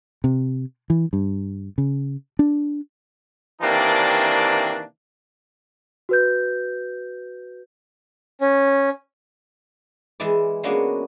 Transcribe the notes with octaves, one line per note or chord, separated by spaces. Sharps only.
C3
E3
G2
C#3
D4
C3 D#3 E3 A#3 D4
F#4 B4 G6
C#4
E3 G#3 E4 D5
G#3 A#3 B3 C#4 D4 F#4